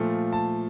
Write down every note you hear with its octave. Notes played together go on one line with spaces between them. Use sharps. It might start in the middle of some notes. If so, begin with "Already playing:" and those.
Already playing: A#2 F3 A3
A5